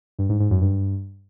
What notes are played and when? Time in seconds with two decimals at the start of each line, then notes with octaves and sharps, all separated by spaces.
0.19 G2
0.29 G#2
0.40 G#2
0.50 F#2
0.61 G2